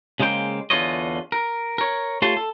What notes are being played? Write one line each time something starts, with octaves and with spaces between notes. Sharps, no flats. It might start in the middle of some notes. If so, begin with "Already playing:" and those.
C#3 G#3 A#3 C5 G5
E2 D3 F4 C#5 D#5
A#4
A#4 C#5
A3 F4 G4 C#5 A5 C6
A4